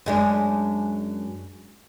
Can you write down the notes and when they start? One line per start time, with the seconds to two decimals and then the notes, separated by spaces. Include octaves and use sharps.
0.06 F#2 G#3 D4